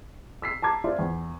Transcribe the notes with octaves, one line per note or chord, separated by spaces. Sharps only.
E6 B6 C7
A5 A#5 D6 G#6
E4 F4 C5 D5
E2